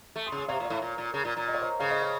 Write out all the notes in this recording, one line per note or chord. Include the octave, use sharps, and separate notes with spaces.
A3
C6 D#6
C#3
C6 D#6
C3 C#5 F5
A#2
C#5 F5
A2
A#2
A#2
C#3
A#2
A#2
D#5
C#5
C5 D#5
C#3 C#5 F5
C5 D#5
C#5